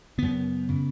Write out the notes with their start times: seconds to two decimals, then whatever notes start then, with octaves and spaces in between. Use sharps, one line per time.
0.18 F#2 C#3 B3
0.69 C#3